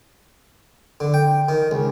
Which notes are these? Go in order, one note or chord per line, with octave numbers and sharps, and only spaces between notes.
D3
G5
D#3
C#2